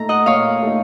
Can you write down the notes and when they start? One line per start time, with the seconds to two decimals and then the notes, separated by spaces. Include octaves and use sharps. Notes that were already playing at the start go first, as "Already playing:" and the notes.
Already playing: A#2 A3 D#4 A#5
0.09 D#5 F#5
0.26 A#2 C#5 F5
0.62 A3 D#4